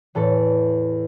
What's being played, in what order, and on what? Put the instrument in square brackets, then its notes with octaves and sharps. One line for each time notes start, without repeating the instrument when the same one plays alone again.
[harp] E2 A2 A4 B4